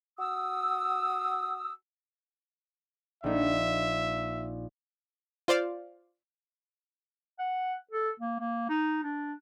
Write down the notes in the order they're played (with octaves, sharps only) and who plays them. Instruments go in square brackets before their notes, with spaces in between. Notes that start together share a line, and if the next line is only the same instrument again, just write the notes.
[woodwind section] F#4 D#6 E6
[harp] A#1 D#4 [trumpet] E5
[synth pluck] F4 C5 D5 F5
[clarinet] F#5
A4
A#3
A#3
D#4
D4